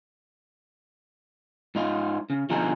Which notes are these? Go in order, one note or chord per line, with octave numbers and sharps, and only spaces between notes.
G#2 D#4 F4
C#3
B2 D3 F3 D#4 G#4 A#5